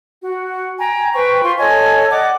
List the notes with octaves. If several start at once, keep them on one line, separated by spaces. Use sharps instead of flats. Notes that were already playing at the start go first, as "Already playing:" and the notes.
F#4
G5 G#5 A#5
B4 C5 G5 C#6
F4 C5 C6 C#6
A4 C#5 D#5 G#5
D5 D#5 F#5 D6